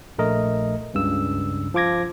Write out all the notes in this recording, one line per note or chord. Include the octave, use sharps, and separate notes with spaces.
A#1 A3 A#4 D#5
C#2 G2 C#3 E6
F3 F4 D6 G#6 A#6